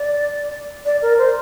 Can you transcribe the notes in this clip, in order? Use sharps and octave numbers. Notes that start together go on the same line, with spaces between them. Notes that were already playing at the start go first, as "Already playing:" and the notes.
Already playing: D5
D5
A#4
C5